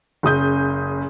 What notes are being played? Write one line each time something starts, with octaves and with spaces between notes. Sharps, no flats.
F#1 C#3 D#6 G6